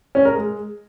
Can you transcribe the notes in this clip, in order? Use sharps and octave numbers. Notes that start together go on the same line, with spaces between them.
C#4
A#4
G#3